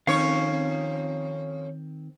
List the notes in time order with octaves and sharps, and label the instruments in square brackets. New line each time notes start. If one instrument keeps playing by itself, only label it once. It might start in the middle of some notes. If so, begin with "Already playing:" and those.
[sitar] F2 C#4 C#5 [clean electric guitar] D#3 C4 [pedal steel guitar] F5 C#6